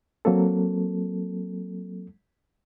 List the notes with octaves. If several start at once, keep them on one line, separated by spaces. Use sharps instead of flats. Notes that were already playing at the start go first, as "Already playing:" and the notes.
F#3 A#3 C4 A4